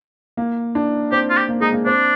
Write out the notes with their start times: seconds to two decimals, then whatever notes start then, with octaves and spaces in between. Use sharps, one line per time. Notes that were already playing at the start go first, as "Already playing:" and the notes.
0.37 A#3
0.75 D4
1.12 C4 G4
1.30 F4
1.37 G4
1.49 A#3
1.60 G#3 D#4
1.73 A#3
1.86 C4 D4